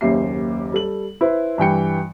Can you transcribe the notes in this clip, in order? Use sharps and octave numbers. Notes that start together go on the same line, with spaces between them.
F#1 D#2 C#4 G4 E5 C7
G3 A4 F#7
E4 B4 C5
G2 E3 G5 C#7